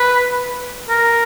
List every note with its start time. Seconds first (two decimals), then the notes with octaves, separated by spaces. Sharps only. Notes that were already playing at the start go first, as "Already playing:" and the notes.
Already playing: B4
0.89 A#4